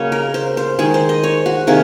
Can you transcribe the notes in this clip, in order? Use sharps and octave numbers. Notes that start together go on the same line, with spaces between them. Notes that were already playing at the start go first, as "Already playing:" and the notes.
Already playing: C#3 F#3 A#3 C#5 D#5
A#4
C5
C5
D#3 G#3 G#4
C5
D#5
C#5
F#4
C3 D#3 A#3 G#4